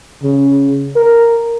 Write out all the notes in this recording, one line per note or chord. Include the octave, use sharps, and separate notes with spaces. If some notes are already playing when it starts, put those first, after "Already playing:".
C#3
A#4